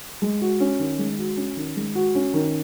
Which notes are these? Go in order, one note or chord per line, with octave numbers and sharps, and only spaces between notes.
G#3
F#4
C#4
D#3
G#3
F#4
C#4
D#3
G#3
F#4
C#4
D#3